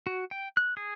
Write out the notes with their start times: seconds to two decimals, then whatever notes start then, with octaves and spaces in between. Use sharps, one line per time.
0.07 F#4
0.31 G5
0.57 F#6
0.77 G#4